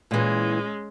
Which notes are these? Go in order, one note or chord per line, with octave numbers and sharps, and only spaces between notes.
A#2 E3 G#3 C#4